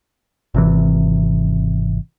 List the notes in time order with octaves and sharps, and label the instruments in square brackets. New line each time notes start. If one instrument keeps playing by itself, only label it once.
[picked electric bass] G#1 C3 E3